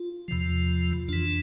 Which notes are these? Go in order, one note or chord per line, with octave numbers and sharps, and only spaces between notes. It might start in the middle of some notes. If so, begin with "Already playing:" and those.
Already playing: F4
E2 C3 F3
F2 E3 D4